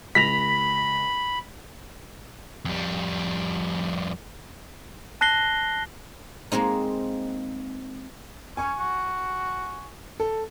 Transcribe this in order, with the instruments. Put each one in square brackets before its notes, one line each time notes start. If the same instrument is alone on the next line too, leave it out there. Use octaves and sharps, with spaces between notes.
[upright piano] C#2 A#6 F7 [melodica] B5 [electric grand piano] B6
[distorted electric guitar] F2 G3
[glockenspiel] A5 F#6 A#6 C7 G7
[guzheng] G#3 A#3 C4 D#4
[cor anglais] C#4 [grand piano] G#5 C#6
[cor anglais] F#4
[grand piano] A4